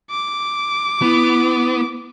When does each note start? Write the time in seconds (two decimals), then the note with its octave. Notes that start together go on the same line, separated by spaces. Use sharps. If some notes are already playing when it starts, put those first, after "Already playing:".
0.10 D6
1.02 B3 E4